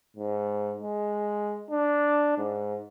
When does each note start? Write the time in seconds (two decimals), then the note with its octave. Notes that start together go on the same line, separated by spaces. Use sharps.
0.17 G#2
0.81 G#3
1.71 D4
2.38 G#2